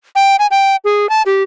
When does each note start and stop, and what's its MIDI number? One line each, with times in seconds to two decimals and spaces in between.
0.15 0.36 79
0.39 0.47 80
0.51 0.76 79
0.85 1.09 68
1.09 1.22 81
1.26 1.43 67